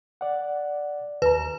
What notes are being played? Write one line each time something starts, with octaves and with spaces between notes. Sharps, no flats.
D5 F#5
D#2 B4 A#5